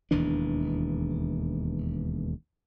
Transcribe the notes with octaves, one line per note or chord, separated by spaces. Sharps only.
E1 D#2 E3 D4